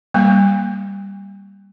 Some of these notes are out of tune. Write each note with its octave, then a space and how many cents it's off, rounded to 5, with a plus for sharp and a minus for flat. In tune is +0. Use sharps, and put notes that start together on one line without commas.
G3 +5 A#3 +0 C#6 +15